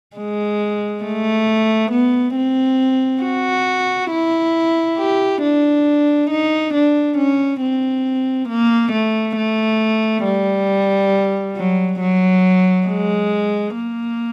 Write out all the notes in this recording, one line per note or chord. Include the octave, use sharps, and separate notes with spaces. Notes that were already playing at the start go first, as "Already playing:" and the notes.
G#3
A3
B3
C4
F#4
E4
G4
D4
D#4
D4
C#4
C4
A#3
A3
A3
G3
F#3
F#3
G#3
A#3